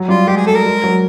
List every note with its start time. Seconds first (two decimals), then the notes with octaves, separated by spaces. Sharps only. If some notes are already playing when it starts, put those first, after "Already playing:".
Already playing: F#3
0.08 G3 F4
0.27 G#3 G4
0.37 G#4
0.46 A3 A4
0.55 A#4
0.65 G#3
0.84 F#3